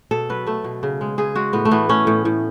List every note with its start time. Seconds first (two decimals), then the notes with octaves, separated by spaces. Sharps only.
0.11 B2 A4
0.29 F#3 B4
0.47 A3 A4
0.64 B2
0.83 C#3
1.01 G#3
1.18 C#3 G#4
1.35 G#3 F#4
1.53 A2 B3
1.65 A3
1.71 E3 B3
1.89 A3 C#4
2.07 A2
2.25 A2